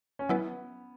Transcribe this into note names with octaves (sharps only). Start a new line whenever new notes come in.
C#4
F#3 B3 E4 B4